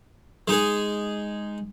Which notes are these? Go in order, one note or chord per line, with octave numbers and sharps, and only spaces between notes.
G#3 D#4 G#4